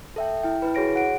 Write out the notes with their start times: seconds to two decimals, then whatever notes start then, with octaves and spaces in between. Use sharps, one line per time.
0.16 A4 E5 G5
0.43 E4 G5
0.62 E4 B4
0.75 F#4 G#4 C#5 A#6 D7
0.96 F#5 D7